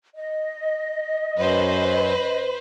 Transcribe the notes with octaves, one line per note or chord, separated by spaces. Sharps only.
D#5
F#2 F#3 B4 C5